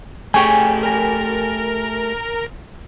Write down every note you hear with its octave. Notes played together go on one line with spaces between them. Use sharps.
A3 G4 G#4 C#5 G5 G#5
A#4 A#5